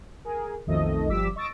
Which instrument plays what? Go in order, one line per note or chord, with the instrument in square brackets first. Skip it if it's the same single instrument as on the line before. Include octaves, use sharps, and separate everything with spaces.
[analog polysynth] G#4 A#4
B1 F2 D#3 A3 D#5
G1 F3 G3 D6 E6 B6
D#5 C#6 E6 A6 A#6 D7